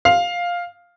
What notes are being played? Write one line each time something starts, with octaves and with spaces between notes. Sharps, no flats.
F5